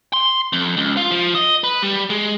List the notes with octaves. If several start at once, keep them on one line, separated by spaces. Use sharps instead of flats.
C6
F2
C#2
F4
F3
D#5
B4
G3
G#3